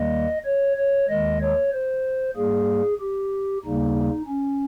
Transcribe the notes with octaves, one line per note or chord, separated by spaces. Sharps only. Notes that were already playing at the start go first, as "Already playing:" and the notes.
Already playing: D#2 D#3 G3 A#3 D#5
C#5
C#5
D#2 D#3 G#3 D#5
C#5
C5
G#2 G3 A#3 G#4
G4
D#2 C#3 G3 A#3 D#4
C#4